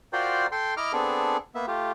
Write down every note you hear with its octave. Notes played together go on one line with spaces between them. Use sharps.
F4 F#4 A#4 C5 D5 G5
A4 G5 C6
E4 D#5 A#5 D6 F6
B3 C4 D4 G#4 A4
A#3 B3 E5
A3 F4 G4